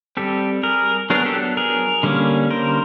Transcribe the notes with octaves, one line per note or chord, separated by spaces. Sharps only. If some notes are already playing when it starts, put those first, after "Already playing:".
G3 C4 G4 A4
G#4 A#4
F#3 B3 D4 G#4 A#4
G4 A4
G#4 A#4
D3 G3 A#3 C#4
A#4 C5